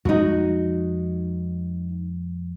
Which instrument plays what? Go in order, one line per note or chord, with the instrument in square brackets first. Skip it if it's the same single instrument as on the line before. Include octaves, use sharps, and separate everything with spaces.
[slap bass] F2 G#3 [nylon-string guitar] D#4 F#4